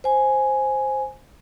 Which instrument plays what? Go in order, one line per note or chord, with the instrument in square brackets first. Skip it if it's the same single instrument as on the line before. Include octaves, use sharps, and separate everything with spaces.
[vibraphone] C5 G#5